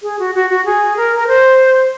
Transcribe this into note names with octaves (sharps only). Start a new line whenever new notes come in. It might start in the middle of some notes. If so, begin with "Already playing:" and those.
G#4
F#4
F#4
F#4
G#4
A#4
A#4
C5